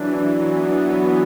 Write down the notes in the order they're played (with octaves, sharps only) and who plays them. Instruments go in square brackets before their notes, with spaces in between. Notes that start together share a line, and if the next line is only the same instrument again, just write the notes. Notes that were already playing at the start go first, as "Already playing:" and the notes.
Already playing: [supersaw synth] E3 [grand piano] F#3 D4
[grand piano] D4
[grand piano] F#3 [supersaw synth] B3
[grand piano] D4
F#3